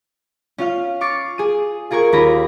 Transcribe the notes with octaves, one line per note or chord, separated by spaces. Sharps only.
C#4 F4 F5
C#6 D6 F6 A6 C7 C#7
G#4 D#7
F4 G#4 A#4 C#6 G#6
D#2 C#4 F4 B5 A#6